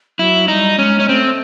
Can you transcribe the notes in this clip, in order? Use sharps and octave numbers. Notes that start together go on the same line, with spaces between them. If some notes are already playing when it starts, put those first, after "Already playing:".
F#3 E4
G3 D#4
G#3 C#4
C#4
A3 C4